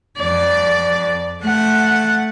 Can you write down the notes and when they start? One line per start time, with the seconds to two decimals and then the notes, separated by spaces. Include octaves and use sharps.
0.18 F2 D5
1.43 A3 F#5